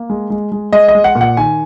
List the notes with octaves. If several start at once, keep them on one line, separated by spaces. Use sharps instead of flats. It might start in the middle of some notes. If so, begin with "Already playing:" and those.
Already playing: A#3
G#3
G#3
G#3
G#3 D#5
D#5
G#3
F#5
A#2
F#5
D#3 G#5